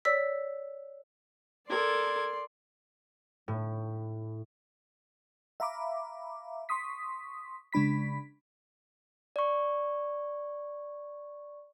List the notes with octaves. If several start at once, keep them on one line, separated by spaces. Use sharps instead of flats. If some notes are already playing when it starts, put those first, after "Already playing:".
C#5 D5 E6 B6
A4 A#4 D5 C6 G#6
A2
E5 F5 A#5 B5 D6
C6 C#6 D#6 B6
C#3 G#3 D4 B5 B6
D5 C#6